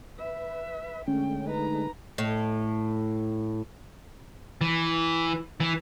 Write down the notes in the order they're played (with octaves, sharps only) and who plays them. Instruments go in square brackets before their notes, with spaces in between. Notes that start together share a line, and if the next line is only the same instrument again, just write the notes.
[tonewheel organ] B4 [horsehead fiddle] E5
[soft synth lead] B6
[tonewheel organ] D3 G#3 A3 [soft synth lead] C#4 [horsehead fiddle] G5
[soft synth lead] D#4 [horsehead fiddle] B4 A#5
[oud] A2
[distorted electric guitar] E3
E3